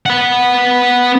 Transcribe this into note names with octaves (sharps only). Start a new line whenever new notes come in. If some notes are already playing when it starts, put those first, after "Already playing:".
B3 F#5